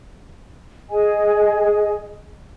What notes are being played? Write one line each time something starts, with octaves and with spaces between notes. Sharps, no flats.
G#4 D#5 G#5